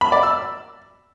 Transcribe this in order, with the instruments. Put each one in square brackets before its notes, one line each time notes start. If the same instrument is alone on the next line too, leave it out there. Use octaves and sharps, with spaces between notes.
[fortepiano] B5
D5
E6